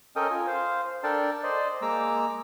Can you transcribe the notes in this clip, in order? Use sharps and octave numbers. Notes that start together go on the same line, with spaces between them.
C#4 A4 A#4 D#5 G5 D#6
F4 G#5
C5 F5
D4 A4 A#4 D5 G5 A5
C5 D5 D#5
G#3 A#3 A#5 D6 E6